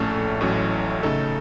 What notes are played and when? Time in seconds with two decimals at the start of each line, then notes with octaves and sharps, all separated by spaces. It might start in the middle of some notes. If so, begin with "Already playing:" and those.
Already playing: A#1 A2 A3 C#4 A4
0.40 A1 A2 F#3 A3 C#4
1.03 C#3 A3 D#4 A4